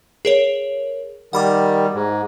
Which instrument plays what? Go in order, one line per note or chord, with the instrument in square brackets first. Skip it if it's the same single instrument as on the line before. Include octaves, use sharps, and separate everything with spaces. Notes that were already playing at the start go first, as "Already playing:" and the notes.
[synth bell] G#4 A#4 C#5
[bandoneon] D#3 G3 [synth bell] F#5 B5 D6
[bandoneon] G#2